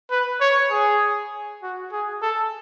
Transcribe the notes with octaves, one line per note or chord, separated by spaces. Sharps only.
B4
C#5
G#4
F#4
G#4
A4